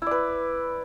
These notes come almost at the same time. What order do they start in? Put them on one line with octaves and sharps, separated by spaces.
E4 D5 B4